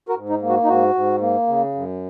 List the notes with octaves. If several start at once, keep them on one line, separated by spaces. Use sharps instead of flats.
F#4 A#4
G#2
D#4
A#3
F#4
D#4
G#2 F#4
G#2
A#3
C#3
F#2